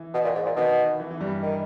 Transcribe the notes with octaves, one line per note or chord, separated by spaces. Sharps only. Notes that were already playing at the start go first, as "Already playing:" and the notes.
Already playing: E3
B2
A#2
G#2
A#2
B2 D#3
E3
E3
G2 G3
D#3